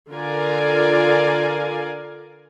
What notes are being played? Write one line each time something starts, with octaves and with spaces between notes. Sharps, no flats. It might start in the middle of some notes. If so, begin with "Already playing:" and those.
D3 F4 A#4 D5 F5 G#5